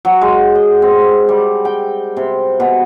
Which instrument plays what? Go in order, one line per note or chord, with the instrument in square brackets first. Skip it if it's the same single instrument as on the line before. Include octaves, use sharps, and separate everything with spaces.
[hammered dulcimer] F#3
G#3
D#5
C4
G3
G5
C3
B2